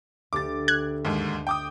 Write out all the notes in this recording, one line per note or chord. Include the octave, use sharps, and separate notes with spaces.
D2 G4 D6 A6
F#6 G#6
D#2 G#2
G5 D6 D#6